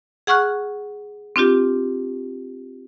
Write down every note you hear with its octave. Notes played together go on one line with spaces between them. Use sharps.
G#4 F#5 C#6 F6 F#6
C4 D4 F4 G4